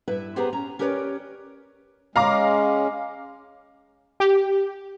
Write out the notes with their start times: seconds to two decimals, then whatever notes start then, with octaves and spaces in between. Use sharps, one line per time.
0.08 G2 E4 B4 E5
0.36 B3 G4 G#4 B4 C5 A#5
0.53 C#4 A#5
0.79 C#4 G4 A#4 B4 C#5 D5
2.16 G#3 C#4 F5 A#5 D6
4.20 G4